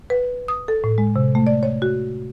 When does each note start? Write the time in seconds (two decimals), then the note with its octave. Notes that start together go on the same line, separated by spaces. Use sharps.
0.10 B4
0.48 D#6
0.68 A4
0.84 A2
0.98 G#3
1.16 C3
1.35 A3
1.47 D5
1.63 C#5
1.82 F#4